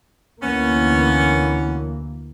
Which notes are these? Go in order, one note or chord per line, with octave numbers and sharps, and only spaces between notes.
D2 E3 A#3 B3 C#4